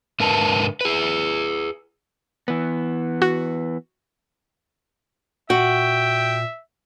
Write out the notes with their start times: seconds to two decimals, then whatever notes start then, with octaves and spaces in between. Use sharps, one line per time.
0.20 G#2 D3 A#4 B4 A5
0.81 G#4 B4
2.48 E3 B3
3.22 F#4
5.50 A#2 F#4 E5 G5